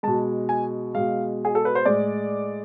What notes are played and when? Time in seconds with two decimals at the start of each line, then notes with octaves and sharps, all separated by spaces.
0.03 B2 G#3 A5
0.49 G#5
0.94 B2 G#3 F5
1.45 G#4
1.55 A4
1.65 B4
1.75 C5
1.85 A2 G#3 D5